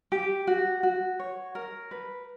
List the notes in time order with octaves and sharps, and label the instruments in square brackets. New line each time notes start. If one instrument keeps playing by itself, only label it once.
[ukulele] G4
F#4
F#4
C#5
A#4
B4